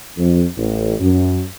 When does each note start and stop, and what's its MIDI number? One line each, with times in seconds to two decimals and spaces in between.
0.17 0.44 41
0.56 0.94 33
1.00 1.42 42